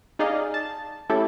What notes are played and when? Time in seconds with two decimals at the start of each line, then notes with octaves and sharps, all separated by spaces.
0.19 D#4 G#4 D5 D#5 F5
0.54 A5
1.09 A3 C#4 E4 G4 A4